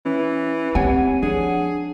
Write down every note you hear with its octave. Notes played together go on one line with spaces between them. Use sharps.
E3 C#4
C4 G4 C#5 F#5 G#5
F3 D4 G#4